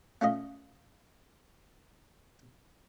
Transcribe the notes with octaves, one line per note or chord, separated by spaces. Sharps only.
A3 C#4 F4 D#5